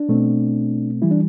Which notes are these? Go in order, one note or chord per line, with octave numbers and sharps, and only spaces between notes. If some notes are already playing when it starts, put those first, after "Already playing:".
Already playing: D4
B2 A3 C4
E3 G3 E4
D4